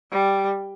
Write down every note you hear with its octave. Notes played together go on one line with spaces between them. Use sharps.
G3